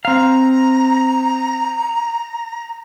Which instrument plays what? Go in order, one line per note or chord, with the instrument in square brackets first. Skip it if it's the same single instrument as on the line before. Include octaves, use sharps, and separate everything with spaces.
[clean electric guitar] C4 F5 [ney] A#5